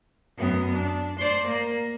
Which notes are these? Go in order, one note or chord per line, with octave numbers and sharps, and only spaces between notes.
F#2 B3
D4
C5 D5
A#3